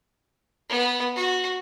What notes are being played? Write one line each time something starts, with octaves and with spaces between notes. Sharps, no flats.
B3
F#4